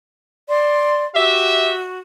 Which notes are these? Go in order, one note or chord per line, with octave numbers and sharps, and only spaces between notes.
D5 C6
F#4 G4 E5